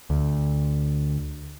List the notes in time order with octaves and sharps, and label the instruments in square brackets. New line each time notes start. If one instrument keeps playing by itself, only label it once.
[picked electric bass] D2